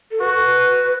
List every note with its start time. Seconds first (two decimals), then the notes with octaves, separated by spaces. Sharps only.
0.11 A4
0.20 F#4 B4